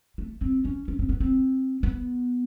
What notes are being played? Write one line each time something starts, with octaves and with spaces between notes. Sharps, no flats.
A3
C4
C#4
C#4
C4
B3
C4
B3